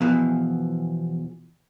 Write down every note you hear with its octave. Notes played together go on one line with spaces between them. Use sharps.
E2 B2 E3 F3